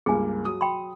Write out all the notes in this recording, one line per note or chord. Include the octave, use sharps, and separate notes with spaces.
C#2 G2 A#3 G#4 G#5
F#3 D#6
G5 B5 C6